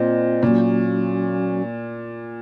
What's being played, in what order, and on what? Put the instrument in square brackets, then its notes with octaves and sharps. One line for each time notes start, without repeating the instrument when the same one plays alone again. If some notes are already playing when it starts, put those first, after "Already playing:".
Already playing: [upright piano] A#2 [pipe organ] C4 F4 C5 D#5
[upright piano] A#2 [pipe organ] F#3 A#3 C#4 F#4